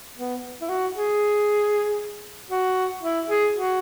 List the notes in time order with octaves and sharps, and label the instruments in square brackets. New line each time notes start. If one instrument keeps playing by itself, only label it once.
[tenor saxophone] B3
E4
F#4
G#4
F#4
E4
G#4
F#4